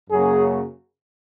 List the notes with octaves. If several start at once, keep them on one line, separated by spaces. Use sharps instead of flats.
F#2 C#3 F#3 A#3 G#4